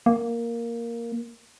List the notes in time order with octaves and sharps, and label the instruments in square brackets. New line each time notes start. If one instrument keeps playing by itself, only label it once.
[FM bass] A#3